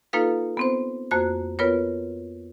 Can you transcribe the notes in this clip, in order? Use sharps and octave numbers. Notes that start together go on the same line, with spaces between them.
A#3 D#4 F4 A4 B4 F5
B3 C4 C5
F2 A#3 F#4 C5 F#6
B3 F4 A#4 B4 C#5